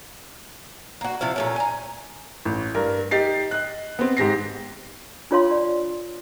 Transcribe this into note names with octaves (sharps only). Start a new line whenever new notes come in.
A#3 F#4
C3 F3 E4 F5
A#2 A3 C#4
G#5 A#5
A1
G2 A#4
D#4 G4 A6 C7
D#5 F#6
B3 C4
G#2 G4 A#6 C7
D4 F4 C#5 F5 C6
D5